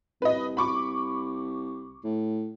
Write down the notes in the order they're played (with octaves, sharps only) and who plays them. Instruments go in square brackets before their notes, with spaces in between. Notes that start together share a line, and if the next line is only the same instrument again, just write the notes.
[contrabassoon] C2 [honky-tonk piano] B4 D#5
[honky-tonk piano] B5 C#6 D6
[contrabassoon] A2